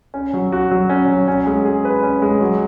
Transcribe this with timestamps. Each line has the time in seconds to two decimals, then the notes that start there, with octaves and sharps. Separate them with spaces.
0.14 C#4
0.33 F#3
0.52 F#4
0.71 F#3
0.90 C#4
1.08 F#3
1.28 C#4
1.46 G#3
1.65 G#4
1.84 B4
2.03 C#4
2.22 G#3
2.40 F#3